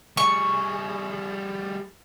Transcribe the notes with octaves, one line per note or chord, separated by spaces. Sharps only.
G3 G#4 C#6